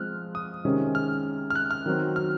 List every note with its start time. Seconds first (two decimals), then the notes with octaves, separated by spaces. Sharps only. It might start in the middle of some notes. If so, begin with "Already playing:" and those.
Already playing: F3 G#3 C4 F6 F#6
0.35 D#6
0.65 C3 D#3 G#3 C#4
0.95 F6
1.50 F6
1.56 F#6
1.71 F6
1.86 D#3 F#3 C4
2.16 F6